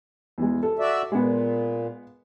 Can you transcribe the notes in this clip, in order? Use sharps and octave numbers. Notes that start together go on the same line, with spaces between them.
E2 G#3
A4
F#4 D5 E5
A#2 G#3 B3